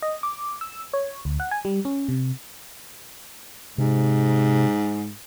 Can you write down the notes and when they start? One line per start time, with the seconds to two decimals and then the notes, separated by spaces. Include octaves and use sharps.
0.02 D#5
0.23 D6
0.61 E6
0.93 C#5
1.25 D2
1.40 F#5
1.51 G#5
1.65 G3
1.85 C#4
2.09 C3
3.78 G#2 C3